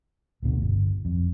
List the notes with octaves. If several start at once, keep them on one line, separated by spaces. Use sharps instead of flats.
A1 D2 B2 D3
G1
F2